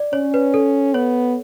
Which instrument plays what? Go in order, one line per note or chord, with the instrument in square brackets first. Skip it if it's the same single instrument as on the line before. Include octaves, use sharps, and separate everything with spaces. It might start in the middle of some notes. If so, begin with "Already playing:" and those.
Already playing: [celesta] D5
[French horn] C#4 [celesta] C#5
[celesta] B4
A4
[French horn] B3 [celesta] C#5